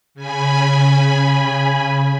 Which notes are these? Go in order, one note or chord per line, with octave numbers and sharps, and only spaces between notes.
C#3 G#5 B5